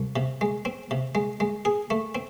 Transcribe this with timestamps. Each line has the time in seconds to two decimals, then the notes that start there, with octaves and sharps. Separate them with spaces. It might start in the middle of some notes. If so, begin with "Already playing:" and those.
Already playing: C2
0.16 C3
0.41 G#3
0.65 C4
0.91 C3
1.15 G#3
1.40 G#3
1.65 G#4
1.90 A3
2.15 C4